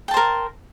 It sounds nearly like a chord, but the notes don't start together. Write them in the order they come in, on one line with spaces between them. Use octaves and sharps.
G5 A5 C5 A#4